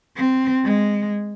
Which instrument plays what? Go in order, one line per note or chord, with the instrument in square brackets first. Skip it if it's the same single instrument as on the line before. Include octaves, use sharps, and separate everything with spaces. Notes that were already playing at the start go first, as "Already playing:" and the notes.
[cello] C4
G#3